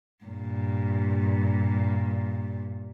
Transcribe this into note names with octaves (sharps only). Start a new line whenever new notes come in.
G2 A#2